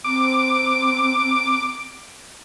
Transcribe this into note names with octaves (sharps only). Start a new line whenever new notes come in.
C4 D6